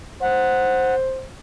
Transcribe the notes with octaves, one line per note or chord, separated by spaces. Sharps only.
C5 F#5